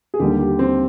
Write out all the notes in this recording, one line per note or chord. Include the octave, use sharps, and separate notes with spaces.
G#4
D#2 D3 G3 G4
G4
C4